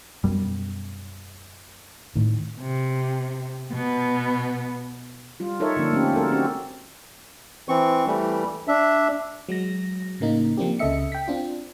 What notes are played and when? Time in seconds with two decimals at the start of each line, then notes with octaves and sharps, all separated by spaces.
0.24 F#2 B2 G3
2.16 A2 D#3
2.60 C3
3.71 B2 B3
5.40 G3 F4
5.60 D#4 A4 A#4 C#5 E5
5.76 D3 F3 A#3 D4
5.92 A3 C4 C#4 G4
6.13 G#3 F#4 A4 A#4
6.31 C4 C#4 F#4 G4
7.69 E3 C4 C#6
8.07 E3 G3 A3
8.68 D4 E5
9.49 F#3 G#3 A#6
10.20 A2 C#3 A#3 D#4
10.57 F3 A#3 C4 D4 G4
10.79 C#2 C#3 A4 D#5 E5 C#7
11.12 G5 B6
11.28 C4 D4 F4